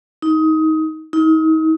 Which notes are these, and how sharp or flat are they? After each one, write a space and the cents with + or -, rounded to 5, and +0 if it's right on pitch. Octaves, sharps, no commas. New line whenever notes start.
D#4 +20
D#4 +35